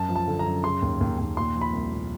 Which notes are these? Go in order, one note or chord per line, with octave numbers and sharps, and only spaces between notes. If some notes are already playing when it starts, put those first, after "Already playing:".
Already playing: F#2 A5
F3
A5
D3
A#5
F#2
C#3 C6
D#2
D#2
D#2
A#2 C6
F3
B5
C2
A#2